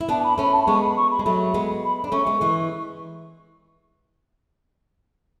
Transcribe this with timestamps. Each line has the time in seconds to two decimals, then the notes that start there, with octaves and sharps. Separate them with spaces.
0.01 E4
0.09 B3 D4 A5
0.24 B5
0.38 A3 C#4 B5
0.52 A5
0.62 B5
0.67 G#3 B3 C#6
0.82 B5
0.96 C#6
1.11 B5
1.19 G#3
1.25 F#3 A3 B5
1.54 G#3 B3
1.83 B5
2.04 D4
2.12 A3 C#4 C#6
2.26 G#3 B3
2.41 E3 G#3